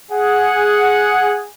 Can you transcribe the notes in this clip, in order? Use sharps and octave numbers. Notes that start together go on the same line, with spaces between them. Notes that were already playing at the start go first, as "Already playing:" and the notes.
G#4 F#5